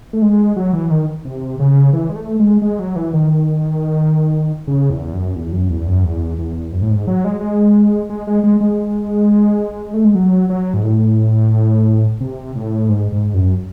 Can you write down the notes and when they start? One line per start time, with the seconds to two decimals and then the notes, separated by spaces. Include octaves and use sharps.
0.13 A3
0.22 G#3
0.56 F#3
0.73 E3
0.90 D#3
1.25 C3
1.59 C#3
1.93 E3
2.09 G#3
2.16 A3
2.40 G#3
2.62 G#3
2.79 F#3
2.96 E3
3.13 D#3
4.67 C#3
4.90 E2
5.13 F#2
5.36 E2
5.52 F#2
5.70 E2
5.87 F#2
6.05 E2
6.39 E2
6.72 F#2
6.82 A2
6.90 G#2
7.07 F#3
7.24 G#3
7.41 G#3
8.10 G#3
8.27 G#3
8.44 G#3
8.61 G#3
9.94 A3
10.05 G#3
10.15 F#3
10.50 F#3
10.74 G#2
10.84 A2
12.20 C3
12.55 A2
12.89 G#2
13.12 G#2
13.34 F#2